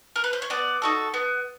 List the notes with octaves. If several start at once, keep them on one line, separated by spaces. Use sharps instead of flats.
A#4
B4
C5
C#5
B3 D5
D#4 F#4 A4
B3